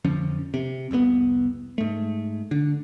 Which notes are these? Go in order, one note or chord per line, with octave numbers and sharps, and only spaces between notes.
F2 D3 F3 C#4
C3
F1 C2 A#2 B3
G#2 A3
D3